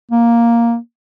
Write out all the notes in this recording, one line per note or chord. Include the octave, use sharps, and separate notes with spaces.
A#3